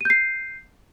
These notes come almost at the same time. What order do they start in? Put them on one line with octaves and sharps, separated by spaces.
D#7 G6 C7